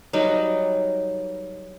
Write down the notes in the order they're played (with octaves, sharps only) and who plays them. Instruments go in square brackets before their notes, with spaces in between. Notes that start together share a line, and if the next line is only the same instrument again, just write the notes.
[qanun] F#3 G3 D#4 B4